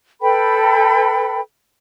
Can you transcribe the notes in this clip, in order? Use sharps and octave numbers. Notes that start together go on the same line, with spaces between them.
A4 B4 G5 B5